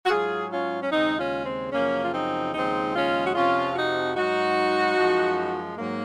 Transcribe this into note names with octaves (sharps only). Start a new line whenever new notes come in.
F#4
G#2 F#3 F4 G#4
C#4 F4
C#4
D#2 C#3 G#3 C4 D#4
C#4 F4
C4
F#2 C#3 F3 A#3 C#4
F4
C4 D#4
D#2 C#3 F3 G#3 C4 D#4
C#4 F4
F#4
F2 C3 F3 C#4 F4
D#4 F#4
G#2 F#3 D#4 F#4
F#2 F3 G#3
G#2 F#3 A#3